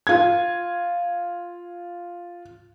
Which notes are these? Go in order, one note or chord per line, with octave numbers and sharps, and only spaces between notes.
F4 G#6